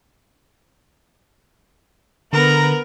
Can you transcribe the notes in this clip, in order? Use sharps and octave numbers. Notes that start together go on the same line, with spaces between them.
D3 B3 A#4 B4 A#5